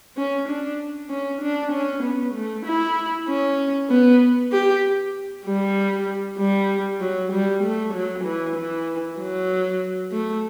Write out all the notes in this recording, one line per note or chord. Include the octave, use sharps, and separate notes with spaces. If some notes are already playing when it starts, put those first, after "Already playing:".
C#4
D4
C#4
D4
C#4
B3
A3
E4
C#4
B3
G4
G3
G3
F#3
G3
A3
F#3
E3
E3
F#3
A3